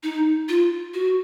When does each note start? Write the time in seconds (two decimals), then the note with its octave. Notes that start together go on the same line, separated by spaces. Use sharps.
0.03 D#4
0.49 F4
0.94 F#4